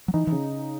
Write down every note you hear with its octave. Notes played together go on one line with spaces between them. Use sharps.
F#3
E3 D#4
E3
C#3